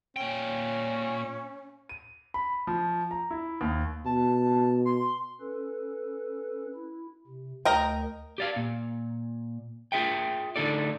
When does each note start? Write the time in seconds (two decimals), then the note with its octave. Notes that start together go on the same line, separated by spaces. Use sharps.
0.16 A#2 C#4 G5
1.89 D#7
2.34 B5
2.67 F3
3.11 A#5
3.31 E4
3.61 D#2
4.05 B2 A5
4.85 C6
5.40 C#4 A4 B4
6.75 E4
7.28 C3
7.65 D2 A#4 D#5 G5
8.38 G4 D5 F5
8.56 A#2
9.92 F4 G#4 E5 G5
10.56 A2 D3 A3 D#4 A4 D5